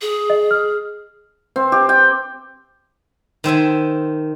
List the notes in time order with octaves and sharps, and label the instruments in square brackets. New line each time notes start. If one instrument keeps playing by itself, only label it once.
[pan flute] G#4
[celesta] D#5
F6
[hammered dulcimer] C4
G4
G5
[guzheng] D#3 C5 E5 G#5